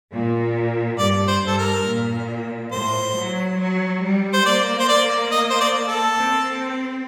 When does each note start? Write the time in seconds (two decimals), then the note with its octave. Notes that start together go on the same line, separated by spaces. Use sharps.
0.13 A#2
0.99 G2 D5
1.28 C5
1.43 G2 A4
1.58 A#4
1.86 A#2
2.72 A2 C5
3.16 F#3
3.59 F#3
4.02 G3
4.33 C5
4.45 A#3 D5
4.80 C5
4.89 D5
5.32 D#5
5.50 C5
5.61 D5
5.89 A4
6.18 C4